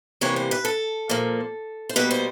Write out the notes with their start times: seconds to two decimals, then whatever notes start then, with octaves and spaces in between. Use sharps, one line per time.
0.21 C3 E3 G3 A#3 C#5
0.36 C5
0.51 B4
0.65 A4
1.09 A#2 F3 A#3
1.89 C5
1.96 B2 G3 A#3 B4
2.11 C5